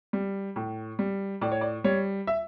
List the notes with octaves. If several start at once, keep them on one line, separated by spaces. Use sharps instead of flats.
G3
A2
G3
A2 D5
C#5
D5
G3 C#5
E5